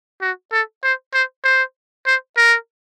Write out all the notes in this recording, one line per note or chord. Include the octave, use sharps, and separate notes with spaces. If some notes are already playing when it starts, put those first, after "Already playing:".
F#4
A4
C5
C5
C5
C5
A#4